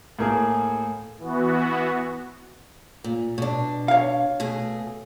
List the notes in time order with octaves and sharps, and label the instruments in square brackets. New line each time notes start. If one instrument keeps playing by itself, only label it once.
[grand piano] A2 A#3 G#4
[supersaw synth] E3 B3 F#4
[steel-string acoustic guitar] A#2
B2 D4
[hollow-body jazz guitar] C#5 F5
[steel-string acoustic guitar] B2 A3 G#4